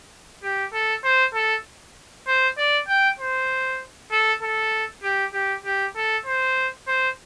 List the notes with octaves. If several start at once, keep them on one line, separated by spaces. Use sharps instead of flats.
G4
A4
C5
A4
C5
D5
G5
C5
A4
A4
G4
G4
G4
A4
C5
C5